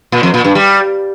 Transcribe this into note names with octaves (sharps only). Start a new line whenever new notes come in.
A#2
F2
A#2
G2
G3